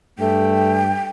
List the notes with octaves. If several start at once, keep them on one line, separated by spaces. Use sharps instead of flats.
G2 A3 G5